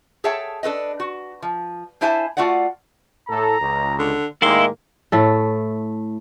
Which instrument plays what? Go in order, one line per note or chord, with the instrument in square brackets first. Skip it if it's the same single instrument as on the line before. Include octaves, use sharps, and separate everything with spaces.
[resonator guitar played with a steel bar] G#4 A4 C#5 E5 G5 A5
D4 A4 B4 D#5
F#4
F3
D4 E4 C5 E5 G#5 A5
A3 F4 F#4 D5 F#5
[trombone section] A2 A4 [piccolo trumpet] A#5
[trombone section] C#2
[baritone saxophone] D3
[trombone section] A2 G#3 A#3 [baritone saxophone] D#3 [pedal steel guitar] E4 F5 C6 [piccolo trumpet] E6
[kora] A2 A3 A4